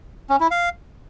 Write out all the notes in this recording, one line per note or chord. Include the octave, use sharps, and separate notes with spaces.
C#4
E4
F5